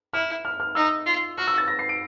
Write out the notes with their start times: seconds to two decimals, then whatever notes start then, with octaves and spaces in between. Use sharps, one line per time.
0.13 E4 F6
0.45 F6
0.60 F6
0.75 D#4 E6
1.06 F4
1.37 F#4 F6
1.48 E6
1.58 A6
1.68 A#6
1.79 C7
1.89 D7